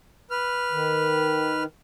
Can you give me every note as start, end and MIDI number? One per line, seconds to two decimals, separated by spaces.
0.31 1.63 71
0.31 1.63 89
0.71 1.66 51